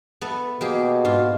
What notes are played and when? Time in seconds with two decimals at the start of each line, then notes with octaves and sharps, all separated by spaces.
0.21 B3 A4 E5
0.61 B2 A#3 G4 G#4
1.05 G#2 F4